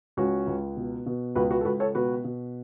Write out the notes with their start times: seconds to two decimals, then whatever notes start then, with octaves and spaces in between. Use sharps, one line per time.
0.17 C#2 C#4 F#4
0.47 C#2
0.77 B2
1.06 B2
1.36 C#2 F#4 B4
1.51 F#4 B4
1.61 A4
1.65 C#2 F#4 B4
1.80 A4 C#5
1.95 B2 F#4 B4
2.24 B2